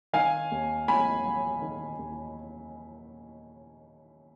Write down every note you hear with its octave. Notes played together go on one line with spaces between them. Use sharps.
D#3 F5 G#5
D#2
D#2 G#5 B5
F#3
D#3
D#2